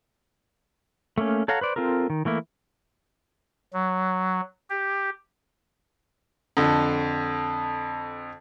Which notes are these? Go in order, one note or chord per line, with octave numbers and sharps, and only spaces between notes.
A3 A#3 C#4
A4 C#5 F5 F#5 A#5
B4 C5 D5
C4 F4 A4 A#4
D#3
E3 A3 A#3 E4
F#3
G4
F2 D3